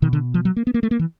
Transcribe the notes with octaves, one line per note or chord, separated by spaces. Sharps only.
B2 D#3
D3
F3
F#3
A#3
B3
A#3
A3
A#3
E3